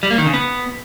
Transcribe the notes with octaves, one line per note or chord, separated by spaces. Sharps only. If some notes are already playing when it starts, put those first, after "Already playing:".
G3
A#3
D#3
C#3
B3